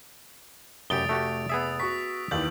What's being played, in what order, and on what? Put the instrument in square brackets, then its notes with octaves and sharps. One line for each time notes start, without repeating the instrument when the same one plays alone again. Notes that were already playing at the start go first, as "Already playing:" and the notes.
[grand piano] F1 G7 [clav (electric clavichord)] F#2 G4 [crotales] D#6 A6 D7
[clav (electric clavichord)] A3 F#4 G4
[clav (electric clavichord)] B3 G#4 E5 [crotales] D#6 E6
[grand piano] F#4 C#6 [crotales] B6
[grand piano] D#2 E3 [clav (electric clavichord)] D5 [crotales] G6 F#7